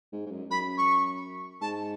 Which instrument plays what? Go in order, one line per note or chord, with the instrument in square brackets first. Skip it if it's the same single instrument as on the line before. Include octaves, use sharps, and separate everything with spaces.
[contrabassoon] G#2
G#2
F#2
[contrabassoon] F#2 [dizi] B5
[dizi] C#6
[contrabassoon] G#2 [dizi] A5